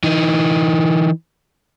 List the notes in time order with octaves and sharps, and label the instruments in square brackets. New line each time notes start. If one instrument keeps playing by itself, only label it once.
[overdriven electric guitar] E3 D#4